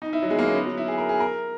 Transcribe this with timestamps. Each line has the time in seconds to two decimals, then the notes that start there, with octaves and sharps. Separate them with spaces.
0.02 D#4
0.13 E4
0.22 F#3
0.30 G#3
0.39 A#3
0.48 C#4
0.55 B3
0.66 F#3
0.77 E4
0.88 G#4
0.98 A#4
1.09 G#4
1.20 A#4